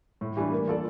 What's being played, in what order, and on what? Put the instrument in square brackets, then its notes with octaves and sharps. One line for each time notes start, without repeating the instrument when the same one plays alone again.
[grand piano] A2
E3 G3 D4
A#3
F4 A4 D5